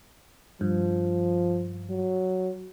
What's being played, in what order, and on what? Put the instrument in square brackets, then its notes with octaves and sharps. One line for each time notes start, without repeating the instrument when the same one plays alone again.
[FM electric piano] G2 [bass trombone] F3
[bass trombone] F#3